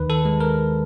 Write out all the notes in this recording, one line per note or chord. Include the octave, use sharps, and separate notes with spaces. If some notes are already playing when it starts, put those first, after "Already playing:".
Already playing: D#2 D#3 B4
A4
G#3
A#4